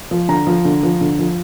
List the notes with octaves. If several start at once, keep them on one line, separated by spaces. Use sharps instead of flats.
F3
D3 A#5
F3
D3
F3
D3
F3